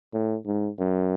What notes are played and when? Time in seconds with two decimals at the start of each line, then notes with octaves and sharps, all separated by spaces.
0.13 A2
0.46 G#2
0.79 F#2